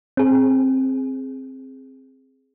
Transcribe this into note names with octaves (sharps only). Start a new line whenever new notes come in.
C4 G#4